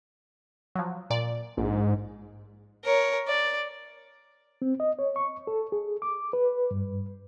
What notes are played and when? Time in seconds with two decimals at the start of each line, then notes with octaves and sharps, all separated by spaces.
0.75 F3 F#3
1.10 A#2 D5
1.57 A#1 G#2
2.84 A#4 C#5
3.28 D5
4.62 C4
4.80 D#5
4.99 C#5
5.16 C#6
5.47 A4
5.72 G#4
6.02 D6
6.33 B4
6.71 G2